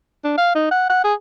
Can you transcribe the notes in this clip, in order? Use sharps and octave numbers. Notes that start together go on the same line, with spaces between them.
D4
F5
D#4
F#5
F#5
G#4